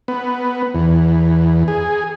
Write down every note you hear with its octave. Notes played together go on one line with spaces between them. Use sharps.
B3
E2
G#4